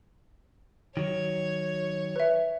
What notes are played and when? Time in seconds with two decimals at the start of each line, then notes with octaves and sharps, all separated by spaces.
0.97 D#3 F#3 C#5
2.16 B4 E5